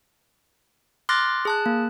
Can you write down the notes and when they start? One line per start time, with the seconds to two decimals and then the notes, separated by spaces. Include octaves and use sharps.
1.09 C6 D6 F6 F#6 A6 A#6
1.45 G#4 A5 F#6
1.66 A#3